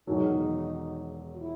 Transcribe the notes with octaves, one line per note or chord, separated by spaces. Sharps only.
E1 E2 D#3 F#3 D#4
F#4
E4